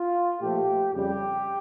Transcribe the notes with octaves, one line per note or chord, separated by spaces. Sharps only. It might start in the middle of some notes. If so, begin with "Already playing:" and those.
Already playing: F4
A#2 F3 A3 G4
F2 C#3 G3 G4